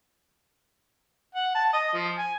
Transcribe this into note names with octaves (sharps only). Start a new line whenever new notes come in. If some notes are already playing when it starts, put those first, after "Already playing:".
F#5
A5
D#5
F3
G#5